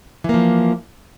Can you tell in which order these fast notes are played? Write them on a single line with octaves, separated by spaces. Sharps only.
E3 A#3 F3